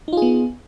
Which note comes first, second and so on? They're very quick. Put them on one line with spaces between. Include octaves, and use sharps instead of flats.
D#4 F4 G#4 B3